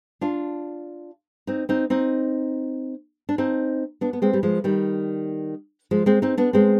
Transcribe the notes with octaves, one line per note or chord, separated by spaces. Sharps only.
D4 F4
C4 D#4
C4 D#4
C4 D#4
D4
C4 D#4
B3 D4
B3
G#3 C4
G3
F3 G#3
D#3 G3
F3 G#3
G#3 C4
C4 D#4
B3 D4
G#3 C4